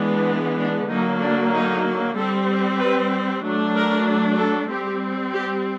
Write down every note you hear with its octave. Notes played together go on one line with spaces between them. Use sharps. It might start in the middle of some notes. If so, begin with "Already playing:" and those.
Already playing: E3 G#3 B3 D4
D4
D3 F#3 A#3 D#4
D4
D#4
G3 C4 A4
B4
F#3 A3 D4
A#4
A4
G3 C4 G4
G4